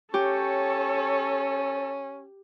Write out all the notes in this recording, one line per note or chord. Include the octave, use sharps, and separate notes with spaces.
C#4 G4 A4 C#5